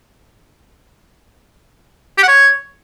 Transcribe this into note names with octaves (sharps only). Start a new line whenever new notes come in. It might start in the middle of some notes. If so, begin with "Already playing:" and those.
G4
F#5
C#5